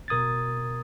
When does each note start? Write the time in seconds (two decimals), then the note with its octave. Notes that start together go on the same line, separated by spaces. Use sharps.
0.08 B2 A#4 D#6 G#6 A6